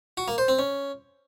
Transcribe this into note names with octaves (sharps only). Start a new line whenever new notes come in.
F#4
A#3
C5
C4
C#4